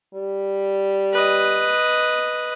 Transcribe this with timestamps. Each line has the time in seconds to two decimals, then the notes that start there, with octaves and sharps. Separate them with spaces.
0.14 G3
1.13 B4 D#5